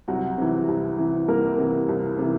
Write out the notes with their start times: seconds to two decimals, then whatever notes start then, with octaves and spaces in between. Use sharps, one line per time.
0.08 C2 F#3 F#4
0.38 C3 E3
0.68 C2
0.98 C3 E3
1.28 C2 A#3 A#4
1.58 C3 E3
1.88 C2
2.18 C3 E3